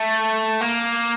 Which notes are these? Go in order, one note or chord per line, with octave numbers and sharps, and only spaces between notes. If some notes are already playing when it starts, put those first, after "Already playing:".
Already playing: A3
A#3